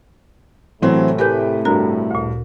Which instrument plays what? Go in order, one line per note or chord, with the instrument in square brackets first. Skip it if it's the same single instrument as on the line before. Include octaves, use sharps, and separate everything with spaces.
[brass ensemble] A2 C3 A3 [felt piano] E3 F#3 C4
[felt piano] G4 B4 [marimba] A#4 G#5 G6
[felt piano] G2 [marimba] F#4 A#4 A#5
[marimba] D2 A#2